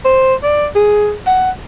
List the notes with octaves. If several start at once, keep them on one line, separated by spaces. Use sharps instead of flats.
C5
D5
G#4
F#5